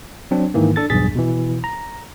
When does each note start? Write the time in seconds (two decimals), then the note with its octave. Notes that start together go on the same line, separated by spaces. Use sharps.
0.31 F#3 C4 D4
0.54 G#2 D#3 E3 A#3
0.76 D4 A4 A6
0.90 B1 E2 G2 G#4 A6 B6
1.15 B2 E3
1.64 A#5